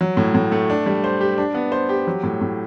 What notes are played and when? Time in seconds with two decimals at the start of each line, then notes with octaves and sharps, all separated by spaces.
0.01 F#3
0.17 A2
0.34 A2
0.52 A3
0.70 D4
0.86 G3
1.04 C5
1.21 G4
1.38 D4
1.54 B3
1.72 C5
1.89 G4
2.07 F#3
2.23 A2
2.41 A2